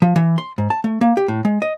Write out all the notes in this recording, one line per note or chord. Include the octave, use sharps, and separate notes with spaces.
F3
E3
C6
G#2
A5
A3
A#3
G4
A2
G#3
D#5